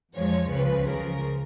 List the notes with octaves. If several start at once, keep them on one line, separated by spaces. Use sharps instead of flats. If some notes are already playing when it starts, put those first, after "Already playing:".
F2 F3 G#3 C#5
C#2 C#3 F3 B4
C#2 C#3 F3 A#4